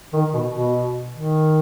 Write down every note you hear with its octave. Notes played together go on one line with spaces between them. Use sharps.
D#3
B2
B2
D#3